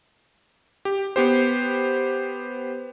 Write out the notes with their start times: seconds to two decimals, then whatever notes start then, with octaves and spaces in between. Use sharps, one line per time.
0.85 G4
1.16 B3 G4 C5